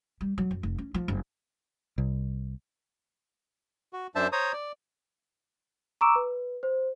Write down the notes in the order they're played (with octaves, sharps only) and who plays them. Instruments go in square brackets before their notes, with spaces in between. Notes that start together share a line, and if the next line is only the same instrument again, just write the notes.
[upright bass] G3
F#3
F#2
F1
C#4
F3
F#1
[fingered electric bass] C2
[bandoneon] F#4
F#2 D4 C5 E5 A5
C5 C#5 A#5 D#6
D5
[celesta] A#5 C#6 D6 E6 D7 E7
B4
C5